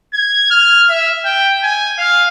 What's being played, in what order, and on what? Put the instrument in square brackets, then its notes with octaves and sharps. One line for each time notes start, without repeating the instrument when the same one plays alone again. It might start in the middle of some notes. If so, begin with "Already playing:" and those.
[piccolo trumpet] G#6
F6
E5
G5
G#5
F5